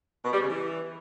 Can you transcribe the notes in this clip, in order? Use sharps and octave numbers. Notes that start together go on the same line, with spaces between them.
B2
G3
C#3
E3